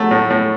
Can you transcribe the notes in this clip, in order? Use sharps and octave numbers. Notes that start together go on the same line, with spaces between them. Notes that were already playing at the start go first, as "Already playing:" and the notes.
Already playing: F#3 A3
A2
A2